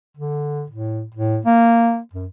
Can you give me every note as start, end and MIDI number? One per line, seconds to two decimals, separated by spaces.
0.17 0.64 50
0.70 1.04 45
1.14 1.39 45
1.45 1.99 58
2.13 2.26 42